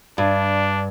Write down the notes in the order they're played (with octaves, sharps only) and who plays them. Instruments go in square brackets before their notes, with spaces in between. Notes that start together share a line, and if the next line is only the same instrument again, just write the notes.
[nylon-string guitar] G2 [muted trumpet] D4